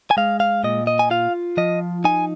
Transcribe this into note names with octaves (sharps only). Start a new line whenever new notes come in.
G#5
G#3 F5
F5
A#2 D#5
D#5
G#5
F4 F5
F3 D#5
D#4 G#5